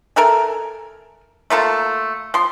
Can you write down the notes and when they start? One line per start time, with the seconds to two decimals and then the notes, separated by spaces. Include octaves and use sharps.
0.16 A4 A#4 E5 G#5
1.50 A3 A#3 F4 A4
2.34 F3 C6